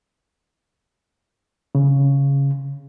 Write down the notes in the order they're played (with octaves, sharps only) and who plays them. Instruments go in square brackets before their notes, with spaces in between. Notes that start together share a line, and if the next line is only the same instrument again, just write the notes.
[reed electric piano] C#3